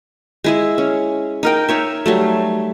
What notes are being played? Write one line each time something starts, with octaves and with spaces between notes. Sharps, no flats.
G#3 E4 G#4
C#4
D#4 A#4 G5
D#4 C#5 E5
F#3 G3 A3